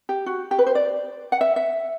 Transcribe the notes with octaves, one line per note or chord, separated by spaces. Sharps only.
G4
F#4
G4
B4
C5
D5
F#5
E5
E5